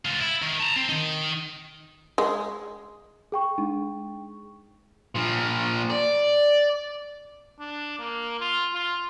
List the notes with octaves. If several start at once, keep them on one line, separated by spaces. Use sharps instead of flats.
G#3 F4
E4
D#3
A5 A#5
C4
D#3 D#4
G#3
G#4 G5 C#6
G#3 D4 D#4
A#2 F3
D5
D4
A#3
F4
F4